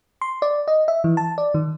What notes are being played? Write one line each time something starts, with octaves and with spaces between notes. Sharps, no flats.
C6
D5
D#5
E5
E3
A5
D5
D#3